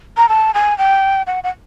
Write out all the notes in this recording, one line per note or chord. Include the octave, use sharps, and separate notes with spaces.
A#5
A5
G#5
G5
F#5
F#5